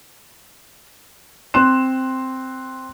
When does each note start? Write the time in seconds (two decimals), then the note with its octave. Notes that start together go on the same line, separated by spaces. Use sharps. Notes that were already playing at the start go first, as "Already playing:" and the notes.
1.54 C4 C6 F#6 E7